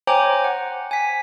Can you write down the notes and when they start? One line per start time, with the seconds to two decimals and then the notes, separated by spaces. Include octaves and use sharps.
0.07 C5 C#5 G5 G#5 A#5 D6
0.44 F#5
0.91 G#5 B6